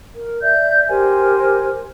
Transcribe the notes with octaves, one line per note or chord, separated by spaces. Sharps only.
A#4
D5 E5 G6
G4 A#4 C5 G#5